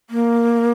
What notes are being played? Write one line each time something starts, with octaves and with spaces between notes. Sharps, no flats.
A#3